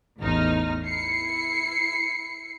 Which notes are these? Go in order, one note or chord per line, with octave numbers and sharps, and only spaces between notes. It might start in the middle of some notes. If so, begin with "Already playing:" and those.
A1 E2 D#4 F6
E4 C7 C#7